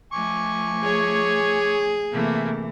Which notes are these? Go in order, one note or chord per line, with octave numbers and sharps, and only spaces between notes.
F3 A3 G#5 C#6 D6
G#4 C#5
C3 E3 A3 A#3